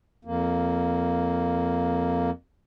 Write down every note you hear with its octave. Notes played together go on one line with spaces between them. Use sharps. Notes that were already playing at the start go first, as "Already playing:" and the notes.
F2 A#3